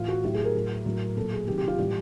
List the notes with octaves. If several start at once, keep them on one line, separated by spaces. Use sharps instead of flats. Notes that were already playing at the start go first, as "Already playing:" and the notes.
Already playing: A2 E3 F4
F#4
A2 F#3 G4
G#4
A#4
A2 F#3
A2 F#3
A#2 F#3 A4
G#4
C3 D#3 F#3 G4
G4
F4
A2 E3 G3 G4